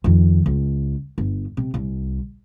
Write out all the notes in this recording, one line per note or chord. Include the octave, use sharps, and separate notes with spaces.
F2 D#3
C#2
G1
C3
C2